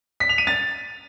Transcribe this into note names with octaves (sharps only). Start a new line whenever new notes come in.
B6
F7
D#7
A6